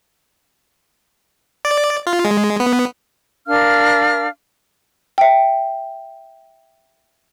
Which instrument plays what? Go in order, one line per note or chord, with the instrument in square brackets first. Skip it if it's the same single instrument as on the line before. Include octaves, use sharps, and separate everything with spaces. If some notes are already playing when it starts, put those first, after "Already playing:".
[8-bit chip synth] D5
F4
G#3
B3
[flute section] D4 A#4 F5 F6
[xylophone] E5 G5